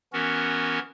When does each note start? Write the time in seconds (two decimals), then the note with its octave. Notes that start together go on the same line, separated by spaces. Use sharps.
0.13 E3 B3 C#4 F#4 A#4